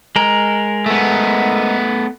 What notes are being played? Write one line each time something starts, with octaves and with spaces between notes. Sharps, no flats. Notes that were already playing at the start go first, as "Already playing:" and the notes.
G#3 A#4
A3 B3